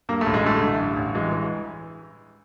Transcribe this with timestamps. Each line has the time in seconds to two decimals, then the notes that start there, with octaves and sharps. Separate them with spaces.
0.09 G2 A#3
0.21 A3
0.26 A1
0.34 G#3
0.44 D3 A3
0.61 A1
0.79 G2
0.97 A1
1.15 E3 G#3
1.32 E3